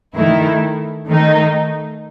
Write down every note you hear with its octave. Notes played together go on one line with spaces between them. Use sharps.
D#3 A3 E4
D#3 A3 D#4